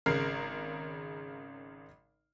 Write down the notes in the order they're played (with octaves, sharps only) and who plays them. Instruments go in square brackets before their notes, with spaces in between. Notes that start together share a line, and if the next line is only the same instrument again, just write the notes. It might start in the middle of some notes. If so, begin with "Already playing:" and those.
[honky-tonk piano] G#1 C#3 A#4 F6 C7